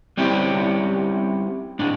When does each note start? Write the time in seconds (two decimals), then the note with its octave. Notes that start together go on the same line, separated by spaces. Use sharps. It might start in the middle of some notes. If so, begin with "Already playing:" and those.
0.17 G3 C4 C#4 E4 G4
1.79 A2 D4